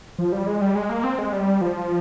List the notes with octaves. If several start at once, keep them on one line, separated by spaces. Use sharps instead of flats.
F3
G3
G#3
G3
G#3
A#3
C4
G#3
G3
F3